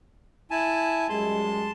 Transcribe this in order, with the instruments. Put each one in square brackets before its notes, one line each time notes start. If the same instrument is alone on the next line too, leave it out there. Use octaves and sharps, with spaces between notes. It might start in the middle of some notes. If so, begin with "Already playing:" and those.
[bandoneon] E4 G#5 A5
[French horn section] F#2 G3 G#3 [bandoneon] A5 C6